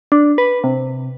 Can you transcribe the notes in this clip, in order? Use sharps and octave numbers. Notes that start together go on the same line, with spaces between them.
D4
B4
C3